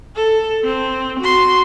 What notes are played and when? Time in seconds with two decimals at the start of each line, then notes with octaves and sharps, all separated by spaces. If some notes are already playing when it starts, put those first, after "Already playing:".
0.16 A4
0.64 C4
1.19 F#4 C6